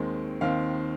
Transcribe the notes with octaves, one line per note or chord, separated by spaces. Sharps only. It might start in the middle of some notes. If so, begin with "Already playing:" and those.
Already playing: D#2 D#3 G#3 C4
D#2 D#3 C4 F5